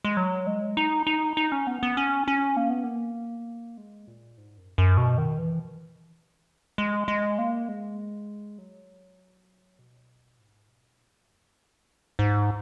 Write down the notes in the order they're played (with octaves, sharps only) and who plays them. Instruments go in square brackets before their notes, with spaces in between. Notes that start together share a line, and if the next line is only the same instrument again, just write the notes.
[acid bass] G#3
F#3
G#3
D#4
D#4
D#4
C#4
B3
B3
C#4
C#4
A#3
B3
A#3
G#3
A#2
G#2
F#2
F#2
B2
D#3
E3
G#3
G#3
A#3
G#3
F#3
B2
G#2
B2
A#2
F#2
E2
F#2
G#2
G#2